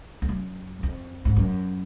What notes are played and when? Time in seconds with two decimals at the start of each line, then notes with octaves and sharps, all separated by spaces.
0.22 F2
0.29 F#2
0.83 F2
1.25 G#2
1.37 F#2